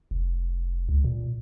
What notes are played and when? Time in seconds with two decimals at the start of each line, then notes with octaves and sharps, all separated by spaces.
0.11 F1
0.89 C#2
1.04 A#2